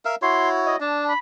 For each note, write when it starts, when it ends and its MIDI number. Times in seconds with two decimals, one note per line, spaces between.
0.05 0.15 70
0.05 0.15 76
0.05 0.15 77
0.22 0.76 64
0.22 0.76 66
0.22 0.76 73
0.22 0.49 84
0.66 0.80 75
0.80 1.13 62
0.80 1.07 81
1.08 1.18 83